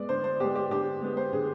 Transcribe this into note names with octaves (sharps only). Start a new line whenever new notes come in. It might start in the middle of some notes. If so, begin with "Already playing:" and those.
Already playing: G#3 B3 D5
D3 C5
C5
G#3 B3 G4
G4
D3 G4
G#3 B3
C5
D3 G#4